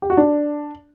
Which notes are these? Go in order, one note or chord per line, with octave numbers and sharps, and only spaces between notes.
G4
F#4
D4